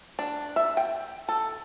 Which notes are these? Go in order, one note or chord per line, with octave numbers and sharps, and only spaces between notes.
D4
E5
G5
A4